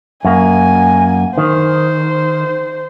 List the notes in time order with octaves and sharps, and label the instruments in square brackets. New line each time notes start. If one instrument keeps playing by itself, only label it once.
[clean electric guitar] F#2 A#3 [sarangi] G#5
[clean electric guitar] D#3 [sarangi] C5